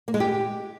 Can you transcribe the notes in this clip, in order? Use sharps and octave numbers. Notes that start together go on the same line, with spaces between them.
A#3
G#3
G4